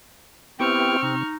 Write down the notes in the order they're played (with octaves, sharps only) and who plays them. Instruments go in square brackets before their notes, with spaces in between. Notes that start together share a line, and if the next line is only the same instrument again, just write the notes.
[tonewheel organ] B3 E4 G4 [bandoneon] C4 [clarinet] G5 [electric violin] C#6 F6
[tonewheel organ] C3 [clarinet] D#4